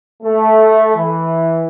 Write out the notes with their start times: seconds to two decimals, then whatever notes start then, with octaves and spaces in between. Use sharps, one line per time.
0.23 A3
0.96 E3